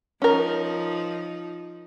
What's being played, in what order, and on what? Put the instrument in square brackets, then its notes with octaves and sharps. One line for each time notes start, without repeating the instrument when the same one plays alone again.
[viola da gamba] F3 D#4 [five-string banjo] C#4 A#4